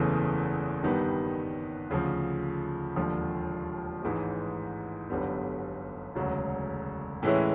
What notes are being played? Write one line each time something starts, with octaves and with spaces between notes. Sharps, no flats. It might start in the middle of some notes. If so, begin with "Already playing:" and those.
Already playing: F#1 E2 C#3 E3 A3
G2 D#3 G3 B3
D2 C#3 F3
E1 D#2 D3 F3
A1 G#2 E3 G#3
G1 F#2 D3 G3 B3
E1 D2 C#3 F#3
A2 E3 G#3 C#4 E4